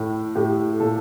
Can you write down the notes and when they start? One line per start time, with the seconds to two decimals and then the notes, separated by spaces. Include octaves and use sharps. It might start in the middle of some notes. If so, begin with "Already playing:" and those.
Already playing: A2
0.35 A2 G4
0.80 A#2 A4